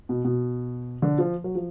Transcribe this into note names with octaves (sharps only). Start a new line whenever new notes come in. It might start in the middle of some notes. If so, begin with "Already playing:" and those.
B2
B2
D3
F3
F#3
F3